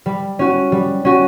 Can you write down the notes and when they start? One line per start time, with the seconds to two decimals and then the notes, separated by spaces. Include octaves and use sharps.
0.06 G3
0.39 C#4 F#4
0.72 G3
1.05 C#4 F#4